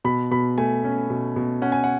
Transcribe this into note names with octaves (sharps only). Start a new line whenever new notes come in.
B2 B5
B2 B5
A3 G#5
C#4
B2
B2
C#4 F#5
G#5
F#5